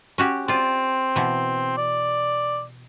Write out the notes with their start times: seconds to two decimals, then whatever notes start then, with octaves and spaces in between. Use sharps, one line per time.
0.18 C#4 F#4 G4
0.48 C4 F4 D5
1.16 B2 E3
1.78 D5